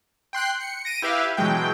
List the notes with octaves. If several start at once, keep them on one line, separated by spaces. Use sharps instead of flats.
G5 C6 F#6 C7
C#7
A#6 D7 D#7
E4 G4 B4 E5 F5
B2 E3 F#3 G#3 G5